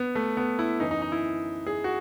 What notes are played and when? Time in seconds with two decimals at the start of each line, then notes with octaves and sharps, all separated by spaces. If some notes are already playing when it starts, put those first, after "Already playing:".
Already playing: B3
0.15 A3
0.37 B3
0.59 E4
0.80 F#2 E3 D#4
0.91 D#4
1.02 D#4
1.12 E4
1.67 G#4
1.84 F#4